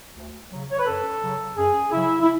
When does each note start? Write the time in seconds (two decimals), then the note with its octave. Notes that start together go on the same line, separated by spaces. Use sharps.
0.16 D2
0.51 C#3 F#3
0.71 C#5
0.79 B4
0.87 F#2 A4
1.22 C#3 F#3
1.57 F#2 G#4
1.92 C#3 F#3 E4
2.21 E4